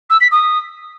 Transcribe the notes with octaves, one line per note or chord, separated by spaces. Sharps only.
E6
B6
D#6